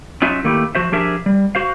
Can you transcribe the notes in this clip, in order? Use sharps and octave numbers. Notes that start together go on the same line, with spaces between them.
F#3 C#4 D#4 F4 E5
D#3 A3 A#3 E4 G4
F3 F#4 C5 E5
F3 D4 G4 G#4 A#4 E5
G3
F#4 C5 F5